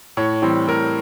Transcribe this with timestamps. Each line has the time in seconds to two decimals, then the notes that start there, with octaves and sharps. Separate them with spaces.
0.17 A2 C#5
0.42 E3 G3 C4
0.67 A2 A#4